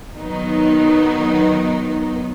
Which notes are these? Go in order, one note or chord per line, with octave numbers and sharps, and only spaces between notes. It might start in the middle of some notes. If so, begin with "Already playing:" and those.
D#3 F#3 B3 D#4